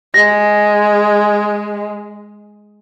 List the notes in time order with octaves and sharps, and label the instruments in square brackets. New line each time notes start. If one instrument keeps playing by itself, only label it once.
[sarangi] G#3 [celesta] A#6